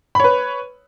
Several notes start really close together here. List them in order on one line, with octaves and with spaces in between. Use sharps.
B5 C#5 B4